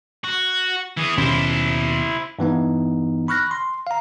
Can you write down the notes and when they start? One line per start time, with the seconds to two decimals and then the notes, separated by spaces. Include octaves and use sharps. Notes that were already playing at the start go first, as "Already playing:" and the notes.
0.24 F#4
0.97 E3 G#4
1.17 D#2 B2 C#4 E4 C5
2.39 G2 E3 B3 D#4
3.28 B5 C#6 F6 F#6 A#6
3.51 C6
3.87 F5 A#5